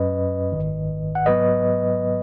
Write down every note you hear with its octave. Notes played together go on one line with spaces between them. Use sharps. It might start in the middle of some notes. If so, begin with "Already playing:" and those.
Already playing: F#2 F#3 C#4 B4 D#5
G#1 G#2 D#3
F#5
G#2 F#3 B3 B4 D#5